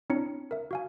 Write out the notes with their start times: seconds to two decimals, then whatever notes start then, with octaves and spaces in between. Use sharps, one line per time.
0.10 C4 D4 E4 C#5 A#5 C#7
0.51 A#4 E5
0.71 F#4 F5 G#5